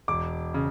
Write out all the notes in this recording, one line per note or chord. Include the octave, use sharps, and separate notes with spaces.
E1 D6
C#3